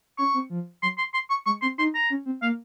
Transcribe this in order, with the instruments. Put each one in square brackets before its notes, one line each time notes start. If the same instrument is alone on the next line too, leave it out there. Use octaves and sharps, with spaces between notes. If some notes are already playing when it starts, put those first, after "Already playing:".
[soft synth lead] C#4 [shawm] C#6
[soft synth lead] C4
F3
[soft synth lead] F#3 [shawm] C6
[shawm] C6
C6
C#6
[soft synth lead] G#3 [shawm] C#6
[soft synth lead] C4 [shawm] C6
[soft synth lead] D#4 [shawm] C6
[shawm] A#5
[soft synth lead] C#4
C4
[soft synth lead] A#3 [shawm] F5